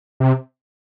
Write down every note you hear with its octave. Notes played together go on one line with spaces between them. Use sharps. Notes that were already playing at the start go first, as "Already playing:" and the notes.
C3